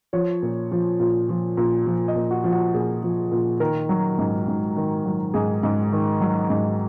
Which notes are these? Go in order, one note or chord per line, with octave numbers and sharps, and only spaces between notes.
F3 C#5
A#2
F3
A#2
F3
A#2
F3
D#5
A#2
F#4
F3
F#4
A#2 G#4
F3
A#2
D#3 A#4
F#3
G#2
G#2
D#3
F#3
G#2 G#4
G#2
D#3
F#3
G#2